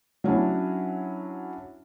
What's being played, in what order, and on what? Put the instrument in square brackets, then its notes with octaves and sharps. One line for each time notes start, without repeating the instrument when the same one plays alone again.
[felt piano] F#3 C#4 D4 E4